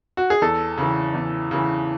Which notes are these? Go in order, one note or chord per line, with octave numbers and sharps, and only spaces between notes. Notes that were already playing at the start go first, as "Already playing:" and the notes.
F#4
G#4
E2 A4
C#3 E3
E2
C#3 E3